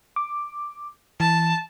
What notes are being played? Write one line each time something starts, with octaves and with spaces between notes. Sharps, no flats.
D6
E3 A5